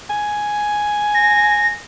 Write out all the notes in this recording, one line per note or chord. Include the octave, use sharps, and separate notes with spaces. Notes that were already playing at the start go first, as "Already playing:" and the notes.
G#5
A#6